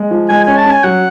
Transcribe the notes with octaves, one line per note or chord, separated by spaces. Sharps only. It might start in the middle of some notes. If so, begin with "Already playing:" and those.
Already playing: G#3
F3
G#3 G#5
C#4 G#5
A5
C#4 G#5
F#3 F#5